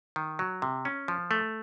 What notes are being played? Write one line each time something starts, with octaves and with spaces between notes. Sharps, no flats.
D#3
F#3
C3
C#4
F3
A3